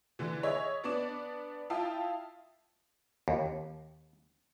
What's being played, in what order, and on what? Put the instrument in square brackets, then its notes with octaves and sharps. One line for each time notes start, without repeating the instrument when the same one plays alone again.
[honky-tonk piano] D3 E3
G#4 C#5 D#5 E5
B3 D4 D5 E7
E4 F4 F5 G5 A5 D#6
[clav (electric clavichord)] D#2